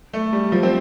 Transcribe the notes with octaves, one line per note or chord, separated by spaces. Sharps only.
A3
G3
F3
C4